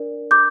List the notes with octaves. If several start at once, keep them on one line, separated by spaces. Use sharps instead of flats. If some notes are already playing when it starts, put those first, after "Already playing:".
Already playing: D4 A#4 D5
D6 G6